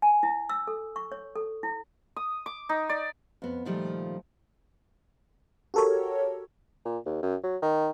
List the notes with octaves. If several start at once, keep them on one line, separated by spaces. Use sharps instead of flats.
G#5
E4
E6
A4
C#6
C#5
A4
E4
D#6
D6
D#4
D5
F2 B3
A#2 D#3 F3 G3 A3 F4
F#4 G4 A4 A#4 C#5
A#2
D#2
F#2
F#3
D#3